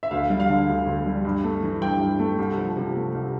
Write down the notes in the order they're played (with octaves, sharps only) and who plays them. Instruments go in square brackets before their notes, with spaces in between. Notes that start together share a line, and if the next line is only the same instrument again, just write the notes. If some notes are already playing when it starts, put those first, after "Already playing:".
[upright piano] E5
D2 F5
G3
F5
D3
D2
D2
G3
G2
A3
E3
G2 G5
G2
A3
C2
F3
C3
A3
C2